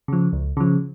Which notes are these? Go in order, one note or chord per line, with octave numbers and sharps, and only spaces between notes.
C#3 F3
C#2
C#3 F3